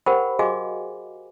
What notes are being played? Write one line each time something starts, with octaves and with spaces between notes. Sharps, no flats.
G4 A#4 C5 F#5 G5 B5
F#4 G#4 D#5 F5 G#5 D6